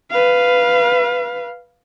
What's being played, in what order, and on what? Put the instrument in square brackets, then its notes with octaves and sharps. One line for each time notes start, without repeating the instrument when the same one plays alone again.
[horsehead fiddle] B4 F5